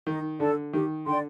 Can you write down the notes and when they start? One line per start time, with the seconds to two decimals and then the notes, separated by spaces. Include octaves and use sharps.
0.07 D#3 D#4
0.40 D3 A4 D5 A5
0.73 D#3 G4
1.06 D3 D5 G5 C6